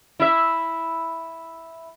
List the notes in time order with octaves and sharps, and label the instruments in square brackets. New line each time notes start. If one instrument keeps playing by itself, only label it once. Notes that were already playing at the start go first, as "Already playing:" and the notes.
[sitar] E4 E5